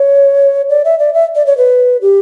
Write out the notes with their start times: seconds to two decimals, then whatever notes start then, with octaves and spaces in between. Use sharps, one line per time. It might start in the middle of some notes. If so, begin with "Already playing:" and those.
Already playing: C#5
0.69 D5
0.85 E5
0.99 D5
1.14 E5
1.35 D5
1.46 C#5
1.58 B4
2.02 G4